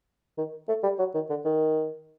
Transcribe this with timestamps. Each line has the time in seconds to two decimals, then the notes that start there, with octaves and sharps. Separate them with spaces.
0.38 D#3
0.69 A3
0.83 G3
0.99 F#3
1.14 D#3
1.30 D3
1.45 D#3